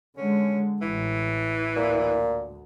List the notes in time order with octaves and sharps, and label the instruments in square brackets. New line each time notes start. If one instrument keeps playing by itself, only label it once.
[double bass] D3 G#3 [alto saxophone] C#4
[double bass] A1 [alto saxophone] E3
[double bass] D2 [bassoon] A#2